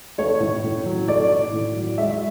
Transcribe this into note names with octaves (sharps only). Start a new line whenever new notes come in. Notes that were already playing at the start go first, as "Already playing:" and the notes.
A3 C#5
A2
A2
F#3
A3 D5
A2
A2
F#3
G#3 E5